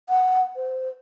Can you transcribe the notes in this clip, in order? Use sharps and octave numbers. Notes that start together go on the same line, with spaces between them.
F#5
C5